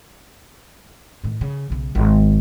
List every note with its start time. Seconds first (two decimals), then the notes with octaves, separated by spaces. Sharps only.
1.24 A2 D#3
1.41 C#3
1.70 B1 C#3
1.95 G#1